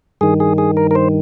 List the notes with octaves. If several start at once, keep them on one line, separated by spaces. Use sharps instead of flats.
G2 D#3 G#4
G#4
G#4
A#4
A#4
C5